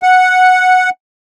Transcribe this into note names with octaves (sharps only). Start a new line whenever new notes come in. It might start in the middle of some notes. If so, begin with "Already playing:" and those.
F#5